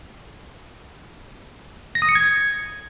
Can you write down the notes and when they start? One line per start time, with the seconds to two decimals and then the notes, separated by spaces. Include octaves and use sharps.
1.95 A#6
2.02 D#6
2.09 C#7
2.15 G#6